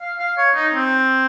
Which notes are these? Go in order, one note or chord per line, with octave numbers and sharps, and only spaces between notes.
F5
F5
C#5
D#4
C4